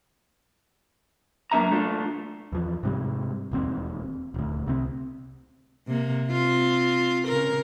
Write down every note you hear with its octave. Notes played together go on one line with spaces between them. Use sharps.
F#2 A#3 D4 E5 A#5
A3 D4 F4
E2 F3
G#2 C3 G3
E1 D#2 C4
D#1 D2
C2 C3 C4
C3 A#3
C4 F4
C#3 A#4